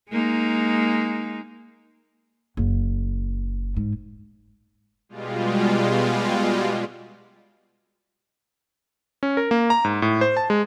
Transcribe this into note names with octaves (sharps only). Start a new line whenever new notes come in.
G#3 A#3 D#4
F#1
G#2
B2 G3 G#3 F4
C#4
A#4
A#3
A#5
G#2
A2
C5
A5
G#3